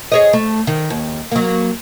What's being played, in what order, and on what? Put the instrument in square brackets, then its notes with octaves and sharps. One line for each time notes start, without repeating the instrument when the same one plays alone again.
[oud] G#4 C#5 D#5
A3
D#3
D#2
F#3 A#3